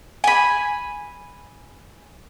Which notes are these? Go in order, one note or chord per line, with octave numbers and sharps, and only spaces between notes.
G#5 B5